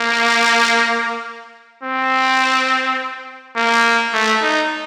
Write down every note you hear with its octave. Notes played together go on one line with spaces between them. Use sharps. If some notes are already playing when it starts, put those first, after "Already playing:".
Already playing: A#3
C4
A#3
A3
D#4